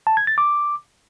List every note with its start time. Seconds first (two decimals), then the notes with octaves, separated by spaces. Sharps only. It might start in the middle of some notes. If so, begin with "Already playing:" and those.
0.07 A5
0.17 G#6
0.27 A6
0.38 D6